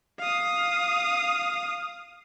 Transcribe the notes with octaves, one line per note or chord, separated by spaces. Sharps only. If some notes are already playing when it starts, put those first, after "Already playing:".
F5 D#6